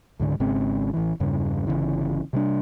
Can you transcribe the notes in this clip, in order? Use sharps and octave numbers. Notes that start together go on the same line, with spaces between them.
C#2 G#2 D3
G#1 G#2 C#3 C4
A1 E3
E2 G2 C#3
G1 C2 C#3 E3
C3 G3 D4